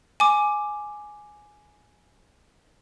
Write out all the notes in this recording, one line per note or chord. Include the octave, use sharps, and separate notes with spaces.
G#5 D6